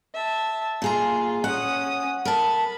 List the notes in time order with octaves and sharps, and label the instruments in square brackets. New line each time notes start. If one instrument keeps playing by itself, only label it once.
[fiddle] E5 A5
[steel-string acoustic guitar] A#2 G#4 A#5 [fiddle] F4
[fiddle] C#4 D#6 [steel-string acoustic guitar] F#5
[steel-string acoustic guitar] A#4 A5 [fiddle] B5